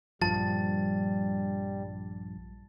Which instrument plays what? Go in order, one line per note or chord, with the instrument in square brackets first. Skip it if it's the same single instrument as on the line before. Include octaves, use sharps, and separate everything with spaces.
[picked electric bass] A#1 G2 F3 [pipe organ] G3 [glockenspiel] A5 A6